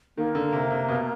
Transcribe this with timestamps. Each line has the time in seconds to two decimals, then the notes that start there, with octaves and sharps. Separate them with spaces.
0.17 D#3 A#3
0.35 D3
0.52 C3
0.71 C3
0.89 B2